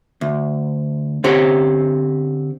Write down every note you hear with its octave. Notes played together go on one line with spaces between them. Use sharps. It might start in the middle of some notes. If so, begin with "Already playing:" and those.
D2
D3 C4 G4 C#5